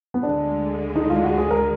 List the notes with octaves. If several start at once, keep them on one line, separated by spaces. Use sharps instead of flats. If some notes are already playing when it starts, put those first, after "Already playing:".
B3
D2 D3 G#3 D4
D#4
F4
F#4
G#4
A#4